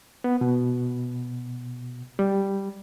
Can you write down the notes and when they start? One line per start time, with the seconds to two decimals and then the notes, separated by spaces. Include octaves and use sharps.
0.24 B3
0.41 B2
2.19 G3